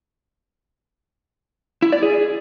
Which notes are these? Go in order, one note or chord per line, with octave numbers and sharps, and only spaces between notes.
E4
D5
G#4